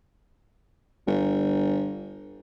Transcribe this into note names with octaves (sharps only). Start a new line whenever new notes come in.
G1